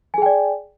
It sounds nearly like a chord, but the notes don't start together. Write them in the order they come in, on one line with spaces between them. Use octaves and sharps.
G#5 G#4 G5 D5